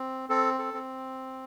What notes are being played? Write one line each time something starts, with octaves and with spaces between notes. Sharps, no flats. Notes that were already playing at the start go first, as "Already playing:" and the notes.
Already playing: C4
C4 A4
A4
C4